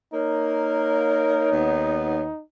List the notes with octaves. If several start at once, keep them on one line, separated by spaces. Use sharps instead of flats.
A#3 D#4 A#4 C#5
D#2 B3